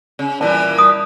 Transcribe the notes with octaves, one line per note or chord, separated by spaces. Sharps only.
C#3
A#2 E3 G3 A5
D#6